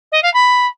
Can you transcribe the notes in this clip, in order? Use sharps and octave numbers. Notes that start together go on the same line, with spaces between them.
D#5
F5
B5